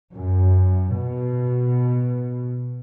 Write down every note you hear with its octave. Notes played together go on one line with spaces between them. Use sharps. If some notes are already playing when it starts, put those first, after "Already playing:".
F#2
B2